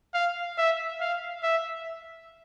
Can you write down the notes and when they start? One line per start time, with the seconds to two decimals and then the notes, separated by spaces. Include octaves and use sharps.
0.14 F5
0.58 E5
1.01 F5
1.43 E5